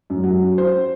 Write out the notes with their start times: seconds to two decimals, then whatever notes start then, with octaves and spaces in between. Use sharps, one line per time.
0.10 F#2
0.24 F#3
0.58 C5